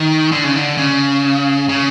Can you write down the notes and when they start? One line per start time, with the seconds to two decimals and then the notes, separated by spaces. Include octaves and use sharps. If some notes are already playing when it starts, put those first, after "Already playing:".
Already playing: D#3
0.32 D3
0.44 C#3
0.56 D3
0.77 C#3
1.69 C#3